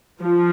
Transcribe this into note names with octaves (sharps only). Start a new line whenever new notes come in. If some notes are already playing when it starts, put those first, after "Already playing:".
F3